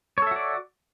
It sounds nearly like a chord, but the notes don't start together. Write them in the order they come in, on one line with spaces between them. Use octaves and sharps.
C#5 A4 E5 F#4 D5